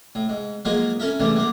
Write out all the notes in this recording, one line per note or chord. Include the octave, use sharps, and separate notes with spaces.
A2
G#2
F3 F#3 G#3 A#3 F4 G#4
C#4 E4 A4 A#4 E5
C#3 E3 G3 A3 A#3
F#3 G3 A#3